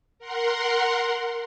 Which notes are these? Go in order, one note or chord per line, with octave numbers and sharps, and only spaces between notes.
A#4 F#5 C6